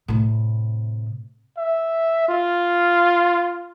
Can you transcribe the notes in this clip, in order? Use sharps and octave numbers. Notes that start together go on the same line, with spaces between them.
A2 C3
E5
F4